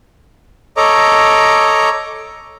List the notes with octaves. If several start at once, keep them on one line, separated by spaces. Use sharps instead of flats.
A4 C#5 D#5 A#5 D6